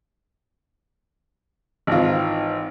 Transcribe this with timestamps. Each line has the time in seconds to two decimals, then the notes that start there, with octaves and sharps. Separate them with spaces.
1.87 G#1 E3 C4 D#4 F4